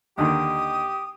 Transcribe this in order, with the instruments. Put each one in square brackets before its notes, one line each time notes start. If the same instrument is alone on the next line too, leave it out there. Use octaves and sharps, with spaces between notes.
[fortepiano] D#2 D3 D#3 [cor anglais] G4 [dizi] D#6